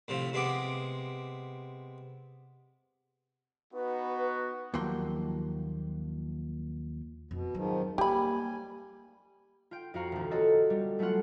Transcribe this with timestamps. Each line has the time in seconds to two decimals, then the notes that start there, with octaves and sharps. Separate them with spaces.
0.08 A2 C3 F3
0.33 C3 G#3 B3 D6
3.73 B3 D#4 F#4 B4
4.74 D#2 F3 F#3 A#3 G5 C6
7.31 F2 B2
7.54 G#2 D#3 F3 F#3 C4
7.98 G3 A#3 G4 G#5 B5
9.71 F4 G5
9.94 F2 F4 F#4 F5 A#5 F#6
10.12 E1 D2
10.31 F4 F#4 A4 C#5 D#5
10.70 G3
10.99 F#3 A3 B3 C#4 F4 F#5